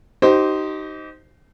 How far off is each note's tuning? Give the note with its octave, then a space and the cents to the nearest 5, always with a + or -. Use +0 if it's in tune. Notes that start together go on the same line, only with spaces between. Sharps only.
D#4 +0 G4 -40 C5 -5